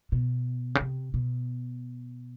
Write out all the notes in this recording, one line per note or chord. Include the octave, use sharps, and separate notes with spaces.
B2
C#3
C3
B2